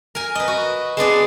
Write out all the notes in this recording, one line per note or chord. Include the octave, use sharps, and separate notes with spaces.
A#4 G#5
B4 D#5
F#4
G#3 B3 D4 G#4